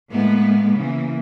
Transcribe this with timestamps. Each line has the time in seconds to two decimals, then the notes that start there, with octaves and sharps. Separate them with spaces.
0.11 A2 G#3 A#3 B3
0.76 C#3 E3 A#3